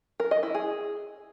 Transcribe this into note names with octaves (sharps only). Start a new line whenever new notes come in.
A#4
D#5
E4
G#4